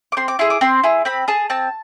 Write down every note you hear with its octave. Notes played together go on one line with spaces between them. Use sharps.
D6
C4 C6
D6
E4 G#4 C6
D6
C4 C6
E4 G#4
C4 B5
G#4 A5
C4 A5